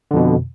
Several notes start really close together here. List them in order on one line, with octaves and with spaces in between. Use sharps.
D3 F2 B2